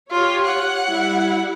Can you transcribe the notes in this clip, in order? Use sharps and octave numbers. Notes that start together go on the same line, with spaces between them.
F4 G4 C#5
F#5
G3 E4